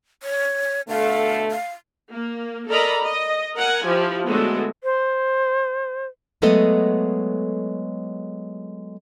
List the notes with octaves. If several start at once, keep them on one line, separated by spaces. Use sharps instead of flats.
C#5
B2 D3 A3 F5
F5
A#3
A4 A#4 D5 D#5 A#5 B5
D#5
A#4 F#5 G#5
F3 E4 G4
D3 F#3 G#3 A3 B3 F#4
C5
F#3 G#3 A3 B3 A4 D#5